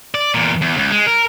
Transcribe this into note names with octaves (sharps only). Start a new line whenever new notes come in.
D5
E2 A#2
E2
C#2
G#3
A#4